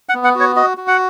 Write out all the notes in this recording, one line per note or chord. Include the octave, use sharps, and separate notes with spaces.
F#5
B3
F#5
F#4 C#5
F#4 D#5
F#4
F#5